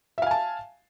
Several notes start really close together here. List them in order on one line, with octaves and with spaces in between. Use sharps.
E5 F5 G#5 A5